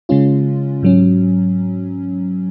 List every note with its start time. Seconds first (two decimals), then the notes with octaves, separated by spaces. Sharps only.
0.09 C#3 G#3 C#4 F4
0.83 G#2 F#3 C#4